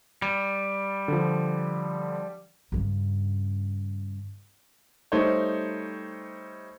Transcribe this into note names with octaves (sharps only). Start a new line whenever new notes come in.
G3
D3 F3
G2 C#3
G3 A3 D#4 C5 C#5